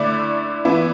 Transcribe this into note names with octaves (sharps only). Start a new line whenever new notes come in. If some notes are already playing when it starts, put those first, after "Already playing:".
Already playing: D3 A3 E4 D5
E3 B3 E4